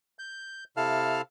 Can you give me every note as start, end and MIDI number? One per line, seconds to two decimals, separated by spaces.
0.19 0.64 91
0.77 1.22 48
0.77 1.22 64
0.77 1.22 69
0.77 1.22 77
0.77 1.22 81
0.77 1.22 89